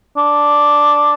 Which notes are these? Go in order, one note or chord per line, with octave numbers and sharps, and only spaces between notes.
D4